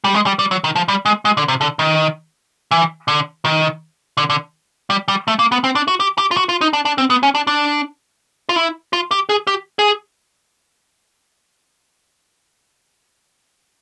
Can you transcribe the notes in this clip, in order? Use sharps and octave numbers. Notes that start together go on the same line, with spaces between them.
G3
G#3
G3
G3
F#3
D#3
F3
G3
G#3
G#3
D3
C3
D3
D#3
E3
D3
D#3
D3
D3
G3
G3
A3
A#3
B3
C4
D4
F#4
G4
G4
F4
F#4
F4
D#4
D4
D4
C4
B3
C#4
D4
D4
F4
E4
F4
G4
G#4
G4
G#4